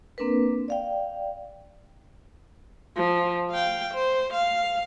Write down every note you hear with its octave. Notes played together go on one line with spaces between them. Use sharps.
A#3 C4 D4 A#4 B4
D5 F5 G5
F3
F5 G5
C5
F5